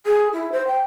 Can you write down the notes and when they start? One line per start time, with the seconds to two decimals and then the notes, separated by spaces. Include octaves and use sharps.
0.06 G#4
0.32 E4
0.51 C5
0.67 G5